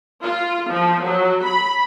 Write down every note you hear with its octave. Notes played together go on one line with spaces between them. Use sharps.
F4
F3
F#3
B5